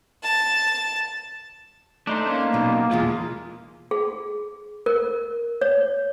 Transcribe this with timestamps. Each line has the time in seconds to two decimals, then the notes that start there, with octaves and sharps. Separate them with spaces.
0.23 A5
2.07 A3 D4 D#4 C5
2.26 A#3 C#4
2.54 B1 B2
2.91 E2 B2 G#3 F4
3.91 G#4
4.86 A#4
5.61 C#5